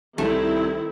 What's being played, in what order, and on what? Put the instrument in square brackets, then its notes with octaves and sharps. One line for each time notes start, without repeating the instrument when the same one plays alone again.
[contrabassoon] C2 [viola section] D#3 C4 E4 [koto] A3